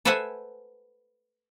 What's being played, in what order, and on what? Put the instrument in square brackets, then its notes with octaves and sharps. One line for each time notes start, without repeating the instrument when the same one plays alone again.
[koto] A4 B4 C5 E5 F#5 G#5